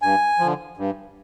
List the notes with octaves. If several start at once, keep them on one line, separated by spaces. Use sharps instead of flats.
G2 G#5
D3 F3
G2